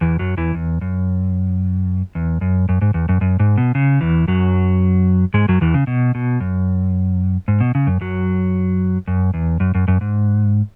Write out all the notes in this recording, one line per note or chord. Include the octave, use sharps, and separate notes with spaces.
E2 E3
F#2 F#3
E2 E3
E2
F#2
E2
F#2
F#2
G#2
E2
F#2
F#2
G#2
B2
C#3
E2 E3
F#2 F#3
G#2 G#3
F#2 F#3
E2 E3
C#3
B2
B2
F#2
G#2
B2
C#3
F#2
F#2 F#3
F#2
E2
F#2
F#2
F#2
G#2